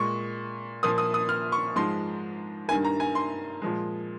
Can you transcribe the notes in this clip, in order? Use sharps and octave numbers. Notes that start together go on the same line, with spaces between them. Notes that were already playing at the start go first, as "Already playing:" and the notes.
Already playing: A#2 G#3 C#6
A#2 F3 A#3 D#6
D#6
D#6
F6
C#6
G#2 F3 G#3 C6
G2 D#3 A#3 G#5
A#5
G#5
C6
A#2 F3 G#3